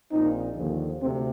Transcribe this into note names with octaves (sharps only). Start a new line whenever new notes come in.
A#1 A#2 F3 C4 D#4
D#2 D3 F3
D2 C3 C4